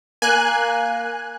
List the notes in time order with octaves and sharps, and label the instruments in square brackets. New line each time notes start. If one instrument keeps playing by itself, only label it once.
[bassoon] A#3 [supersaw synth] G#5 F#6